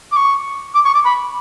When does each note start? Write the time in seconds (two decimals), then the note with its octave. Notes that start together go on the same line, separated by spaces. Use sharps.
0.12 D6
0.17 C#6
0.75 D6
0.85 C#6
0.94 D6
1.05 B5